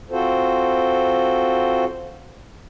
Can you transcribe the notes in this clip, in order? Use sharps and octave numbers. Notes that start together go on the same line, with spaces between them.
C4 F4 F#4 A4 C5